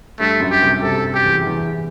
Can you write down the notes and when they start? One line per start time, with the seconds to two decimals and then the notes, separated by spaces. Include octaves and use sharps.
0.19 G2 G3 A3
0.40 F#2 F#3
0.51 G4
0.61 C2 C3
0.83 C2 C3 A4
1.14 G4
1.25 E2 E3
1.46 E2 E3